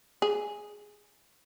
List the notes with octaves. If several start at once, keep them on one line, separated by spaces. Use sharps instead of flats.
G#4